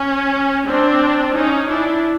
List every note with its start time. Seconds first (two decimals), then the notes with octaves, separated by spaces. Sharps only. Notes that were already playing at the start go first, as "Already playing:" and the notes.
Already playing: C#4
0.67 C4 D4
1.35 C#4 D#4
1.69 D4 E4